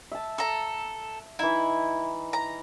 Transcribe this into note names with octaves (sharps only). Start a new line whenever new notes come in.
E5 A5
A4 A#5
E3 D#4 E4
A#5